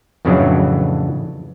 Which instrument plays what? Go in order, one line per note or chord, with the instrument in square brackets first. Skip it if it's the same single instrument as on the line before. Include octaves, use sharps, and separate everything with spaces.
[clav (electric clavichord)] F2 A2 C#3 E3 F#3 D4